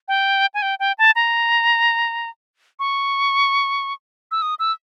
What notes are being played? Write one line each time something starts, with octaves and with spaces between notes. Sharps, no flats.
G5
G#5
G5
G5
A5
A#5
C#6
E6
D#6
E6